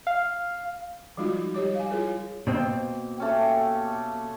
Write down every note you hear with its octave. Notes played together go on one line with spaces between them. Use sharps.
F5
F3 G3 G#3 D#4 F4 F#4
G3 G4 C#5 D6
F5 G#5
E4 F4 G#4 A#4 C#5
B2 A#3 C4
A3 C#4 G4